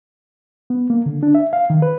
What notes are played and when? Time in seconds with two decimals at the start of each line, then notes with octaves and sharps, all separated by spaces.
0.70 B3
0.90 A#3
1.06 D3
1.23 D4
1.35 E5
1.53 F5
1.70 D#3
1.82 B4